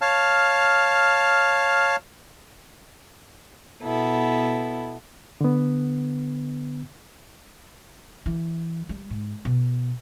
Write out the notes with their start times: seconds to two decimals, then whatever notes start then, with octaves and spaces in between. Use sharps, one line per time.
0.02 C#5 F5 A5 F6
3.83 B2 B3 E4 A4
5.41 D3 B3
8.26 E3
8.89 G3
9.10 G#2
9.45 B2